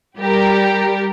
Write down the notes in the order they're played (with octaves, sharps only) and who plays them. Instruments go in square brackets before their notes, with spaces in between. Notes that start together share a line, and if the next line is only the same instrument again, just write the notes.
[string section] G3 G4 A#4